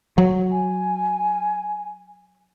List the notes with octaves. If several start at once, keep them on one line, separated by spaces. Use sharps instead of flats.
F#3
G#5